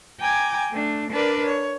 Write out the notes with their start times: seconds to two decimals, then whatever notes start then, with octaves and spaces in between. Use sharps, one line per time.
0.20 G5 G#5 A#5 D6 G#6
0.70 A3 D4
1.11 D4 A#4 B4 D5
1.45 C#5